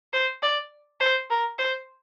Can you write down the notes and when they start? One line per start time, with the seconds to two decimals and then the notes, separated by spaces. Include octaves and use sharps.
0.13 C5
0.42 D5
1.00 C5
1.30 A#4
1.58 C5